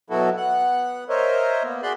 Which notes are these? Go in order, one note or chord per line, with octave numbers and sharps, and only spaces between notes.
B2 F#3 B3 E4 F#4 A4
B3 F#5 F#6
A#4 C5 C#5 D#5 E5
A#3 B3
F#4 G#4 D5 B5 C6 F#6